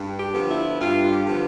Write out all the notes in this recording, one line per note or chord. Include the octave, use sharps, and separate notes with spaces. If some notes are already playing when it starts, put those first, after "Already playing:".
Already playing: G2
G4
D3 F3 B3
E4
G2 F4
G4
D3 F3 B3